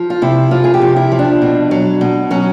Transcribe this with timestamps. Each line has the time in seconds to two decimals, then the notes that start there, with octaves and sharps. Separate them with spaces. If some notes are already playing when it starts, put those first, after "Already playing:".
Already playing: F3
0.10 F4
0.22 C3 E4
0.51 F3 F4
0.64 G#4
0.74 G4
0.82 C3
0.96 E4
1.12 F3
1.19 D4
1.42 B2
1.71 F#3
2.01 B2
2.31 F#3 C#4